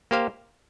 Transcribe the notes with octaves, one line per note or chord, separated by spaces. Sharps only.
A#3 G4 C5 F5